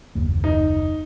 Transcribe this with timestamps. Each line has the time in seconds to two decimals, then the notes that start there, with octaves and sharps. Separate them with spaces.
0.15 F#1 D#2 A#3
0.44 D#4